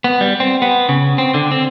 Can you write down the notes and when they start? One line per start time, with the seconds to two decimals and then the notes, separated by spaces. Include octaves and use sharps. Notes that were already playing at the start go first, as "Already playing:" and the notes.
0.04 B3
0.21 G3
0.40 C4
0.62 B3
0.89 C#3
1.18 C4
1.34 D3
1.51 C4